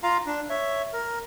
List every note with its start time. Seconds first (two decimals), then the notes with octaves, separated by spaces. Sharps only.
0.03 F4 F5 A#5
0.26 D4
0.50 C#5 E5
0.93 A#4